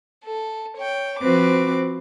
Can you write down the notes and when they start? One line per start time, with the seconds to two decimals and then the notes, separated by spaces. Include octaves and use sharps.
0.24 A4
0.77 C#5 G5
1.19 F3 C4 F#4 B4 D6